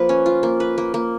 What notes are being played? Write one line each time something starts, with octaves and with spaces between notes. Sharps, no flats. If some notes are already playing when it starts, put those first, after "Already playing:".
Already playing: F3 A#3 B4
C#4
F4
A#3
B4
A#3
A#3